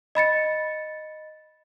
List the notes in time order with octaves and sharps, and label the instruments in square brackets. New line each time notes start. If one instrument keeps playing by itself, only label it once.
[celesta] D#5 B5 A6 C#7